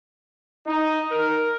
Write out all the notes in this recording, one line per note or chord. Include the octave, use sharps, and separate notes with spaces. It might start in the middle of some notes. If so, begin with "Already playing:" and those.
D#4
A#4